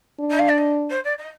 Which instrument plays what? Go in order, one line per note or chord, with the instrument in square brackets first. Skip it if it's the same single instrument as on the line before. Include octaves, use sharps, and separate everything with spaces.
[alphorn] D4
[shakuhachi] D#5
F5
D5
D#5
C5
D5
D#5